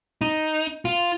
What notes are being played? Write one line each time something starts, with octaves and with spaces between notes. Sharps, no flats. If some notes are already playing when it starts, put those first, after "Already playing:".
D#4
F4